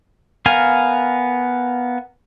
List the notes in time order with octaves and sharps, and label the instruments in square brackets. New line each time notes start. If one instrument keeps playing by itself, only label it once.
[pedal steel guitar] B3 A#4 F5 G#5